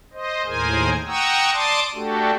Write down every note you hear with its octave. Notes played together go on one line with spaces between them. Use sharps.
C5 D#5
D#2 A2 G#4 A#4 C5 G#5
F#5 G5 A#5 C#6 D#6 E6
D5 A5 C6 D6 D#6
A3 D4 F#4 G4 A4